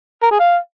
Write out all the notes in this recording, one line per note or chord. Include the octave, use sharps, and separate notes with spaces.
A#4
G#4
F5